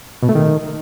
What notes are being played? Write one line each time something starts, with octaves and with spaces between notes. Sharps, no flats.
B2
A3
D#3